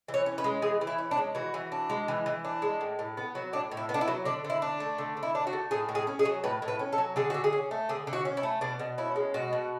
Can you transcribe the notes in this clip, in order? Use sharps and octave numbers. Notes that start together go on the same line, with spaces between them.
E3
C#5
C#4
B4
G#3
E3 G#4
E3
E4
C#4
D4
G#3
E3 F#4
E3
D4
G#3
E3
E3
D4
G#3
A2
A2
B3
F#3
A2 D4
A2
E4
B3
D4
E4
F#3
D3 D4
D3
E4
D4
A3
D3
D3
E4
D4
F#4
A3
A2 G#4
A2
G#4
C#4
G#4
F#3
A2 B4
A2
B4
C#4
A4
F#3
D3 G#4
D3 F#4
G#4
C#4
A3
D3 G#4
D3
F#4
C#4
E4
A3
B2 D4
B2
C#4 E4
G#3
B2 F#4
B2